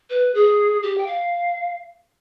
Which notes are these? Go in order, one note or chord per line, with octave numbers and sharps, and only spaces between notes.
B4
G#4
G4
G5
F5